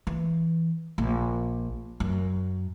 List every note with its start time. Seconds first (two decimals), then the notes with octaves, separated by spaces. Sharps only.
0.07 E3
0.98 A#1
2.00 F#2